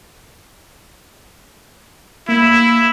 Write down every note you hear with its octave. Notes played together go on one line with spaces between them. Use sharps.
A#3 E4